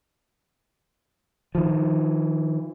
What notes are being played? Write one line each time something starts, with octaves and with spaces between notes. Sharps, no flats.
D#3 F3